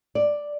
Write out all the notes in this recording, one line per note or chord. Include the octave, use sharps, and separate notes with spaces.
D5